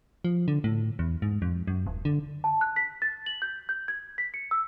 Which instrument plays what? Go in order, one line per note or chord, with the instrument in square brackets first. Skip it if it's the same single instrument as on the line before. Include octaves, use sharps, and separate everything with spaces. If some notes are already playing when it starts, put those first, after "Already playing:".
[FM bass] F3
D3
A2
E2
G#2
F2
F#2
D#1
D3
[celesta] A5
F#6
B6
A6
F#7
G6
G6
G#6
B6
C#7
E6